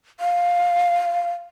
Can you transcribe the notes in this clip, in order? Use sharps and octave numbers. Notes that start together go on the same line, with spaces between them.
F5